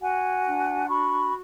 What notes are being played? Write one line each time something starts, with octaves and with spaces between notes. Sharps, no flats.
F#4 F#5 G#5
D4
F#4 B5 C#6